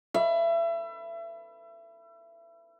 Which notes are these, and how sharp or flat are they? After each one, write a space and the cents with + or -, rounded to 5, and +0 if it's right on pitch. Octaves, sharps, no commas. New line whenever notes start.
E5 +30 B5 +0